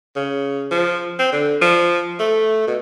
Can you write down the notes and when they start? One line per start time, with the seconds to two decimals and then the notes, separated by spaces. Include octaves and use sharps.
0.16 C#3
0.71 F3
1.19 C4
1.32 D3
1.62 F3
2.19 A3
2.67 B2